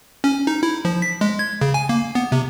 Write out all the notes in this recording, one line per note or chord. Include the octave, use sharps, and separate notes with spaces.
C#4
D#4
E4
F3
B6
G#3
G#6
C#3
G#5
A#3
B3
C3